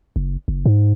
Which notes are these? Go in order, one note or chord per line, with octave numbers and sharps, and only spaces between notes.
F#1
F#1
G#2